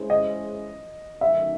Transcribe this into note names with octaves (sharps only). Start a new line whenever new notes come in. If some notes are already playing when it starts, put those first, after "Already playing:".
Already playing: G#3 C#4 E4 G#4 C5
D#5
F#2 D#3 A3 D#4 E5